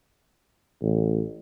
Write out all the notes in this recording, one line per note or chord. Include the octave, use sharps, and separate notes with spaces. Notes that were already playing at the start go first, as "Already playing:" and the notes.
A1